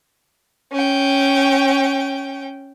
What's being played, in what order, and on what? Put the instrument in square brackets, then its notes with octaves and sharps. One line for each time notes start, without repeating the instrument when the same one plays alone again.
[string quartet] C#4 G5